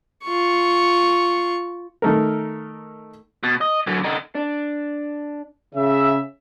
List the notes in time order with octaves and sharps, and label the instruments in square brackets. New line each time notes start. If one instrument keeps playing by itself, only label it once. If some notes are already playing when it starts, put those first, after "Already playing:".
[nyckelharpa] F4 C#6
[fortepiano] D#3 A3 A#4
[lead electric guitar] B2
D#5
D3 F#3
D3 D#4
[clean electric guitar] D4
[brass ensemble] C#3 E5